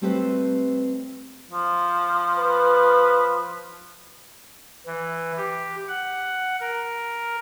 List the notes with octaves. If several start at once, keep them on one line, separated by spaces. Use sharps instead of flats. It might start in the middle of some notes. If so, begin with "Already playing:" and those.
G3 A3 C4 G4 B4 C5
F3
B4
E3
G4
F#5
A#4